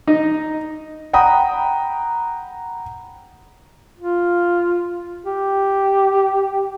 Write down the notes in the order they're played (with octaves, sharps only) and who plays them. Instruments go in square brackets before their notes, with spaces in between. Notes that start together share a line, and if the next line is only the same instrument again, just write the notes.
[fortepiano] D#4
[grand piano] F#5 G5 A#5 B5 D#6
[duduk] F4
G4